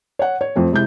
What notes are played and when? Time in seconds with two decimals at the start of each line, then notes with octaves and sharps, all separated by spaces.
0.19 C#5 F#5
0.41 C#5
0.56 F2 A3 C4
0.72 C3 G#3 E4 G6